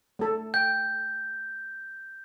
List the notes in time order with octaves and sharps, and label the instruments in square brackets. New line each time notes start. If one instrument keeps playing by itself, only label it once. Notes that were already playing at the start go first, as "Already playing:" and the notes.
[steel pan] A3 A4
[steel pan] G5 [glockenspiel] G6